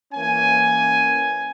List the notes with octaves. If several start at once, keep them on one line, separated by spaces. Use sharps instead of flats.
E3 A#3 C#4 G#5